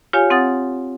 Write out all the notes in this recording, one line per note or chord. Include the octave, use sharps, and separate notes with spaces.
F4 G4 C#5 F5 G#5
C4 F#5 D#6 A6